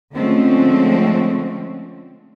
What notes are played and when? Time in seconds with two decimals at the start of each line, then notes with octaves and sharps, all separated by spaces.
0.13 D3 F3 G#3 A3 C4 C#4